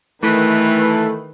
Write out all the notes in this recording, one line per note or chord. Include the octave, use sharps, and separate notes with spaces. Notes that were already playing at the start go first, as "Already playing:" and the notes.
D#3 E3 A3 B4